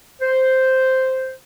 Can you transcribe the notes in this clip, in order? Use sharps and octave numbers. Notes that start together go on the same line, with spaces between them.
C5